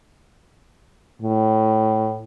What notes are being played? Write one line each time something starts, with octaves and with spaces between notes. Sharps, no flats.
A2